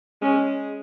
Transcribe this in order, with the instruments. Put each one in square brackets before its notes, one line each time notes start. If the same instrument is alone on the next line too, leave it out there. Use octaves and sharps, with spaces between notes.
[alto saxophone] G#3 [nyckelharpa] C#4